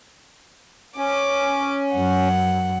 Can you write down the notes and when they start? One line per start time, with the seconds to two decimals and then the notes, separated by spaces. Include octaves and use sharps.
0.98 C#4 D6
1.96 F#2 F#5